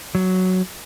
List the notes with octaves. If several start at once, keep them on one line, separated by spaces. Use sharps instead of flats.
F#3